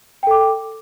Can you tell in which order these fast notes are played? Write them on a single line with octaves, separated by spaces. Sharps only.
G5 A4 D6